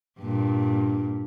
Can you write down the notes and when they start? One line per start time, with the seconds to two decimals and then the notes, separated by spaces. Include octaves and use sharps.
0.20 G2 A#2